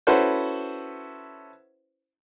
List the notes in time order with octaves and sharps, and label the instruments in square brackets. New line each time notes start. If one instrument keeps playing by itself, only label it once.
[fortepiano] C#4 E4 F#4 A4 B4 C5